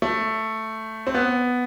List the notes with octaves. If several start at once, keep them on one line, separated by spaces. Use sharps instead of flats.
A3
C4
B3